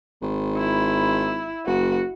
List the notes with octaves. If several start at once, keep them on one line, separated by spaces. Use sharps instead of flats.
G#1
E4
F#1 F#4